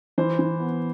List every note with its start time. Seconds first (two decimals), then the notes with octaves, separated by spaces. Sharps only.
0.18 E3 C5
0.39 E3
0.60 B3